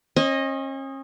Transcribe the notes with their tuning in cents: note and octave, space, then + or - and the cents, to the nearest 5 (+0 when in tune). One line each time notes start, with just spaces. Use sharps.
C#4 -40 D#5 +0